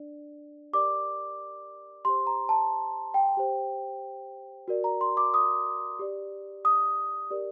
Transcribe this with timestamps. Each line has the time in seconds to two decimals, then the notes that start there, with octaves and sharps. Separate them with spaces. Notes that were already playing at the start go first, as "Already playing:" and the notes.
Already playing: D4 D5
0.73 G4 A#4 D5 D6
2.05 G4 C5 C6
2.27 A#5
2.49 A5
3.14 G5
3.37 G4 C5
4.68 F#4 A#4 D5
4.84 A#5
5.01 C6
5.17 D6
5.34 D#6
5.99 G4 D5
6.65 D#6
7.30 G4 A#4 D5